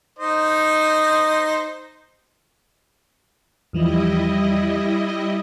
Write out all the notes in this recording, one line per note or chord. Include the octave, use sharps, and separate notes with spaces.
D#4 C5 D#5
E2 E3 F3 G3 E4 D#5